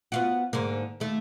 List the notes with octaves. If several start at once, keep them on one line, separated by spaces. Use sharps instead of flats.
B3 F4 F#4
G#2 D3 A#3
D#2 A3